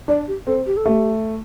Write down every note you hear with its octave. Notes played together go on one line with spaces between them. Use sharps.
D4 D5
G4
C4 A4
G4
A4
A3 G4